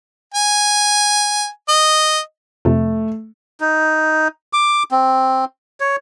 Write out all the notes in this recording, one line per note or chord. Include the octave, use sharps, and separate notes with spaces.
G#5
D#5
F2 C3 A3
D#4
D6
C4
C#5